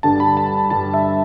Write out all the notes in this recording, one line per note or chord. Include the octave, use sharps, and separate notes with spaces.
G2 D3 G3 D4 A5
B5
A5
G2 D3 G3 D4 A5
E5